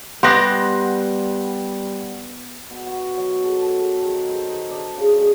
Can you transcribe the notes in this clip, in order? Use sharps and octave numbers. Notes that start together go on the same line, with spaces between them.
G3 B3 G4 F#5 C6 F#6 A#6
B2
F#4
F#3
A4
A5
A4
D#3
C5
D#4
D4
C#3
G#3